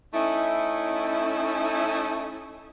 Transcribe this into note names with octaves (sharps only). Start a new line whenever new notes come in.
A3 C#4 D#4 E4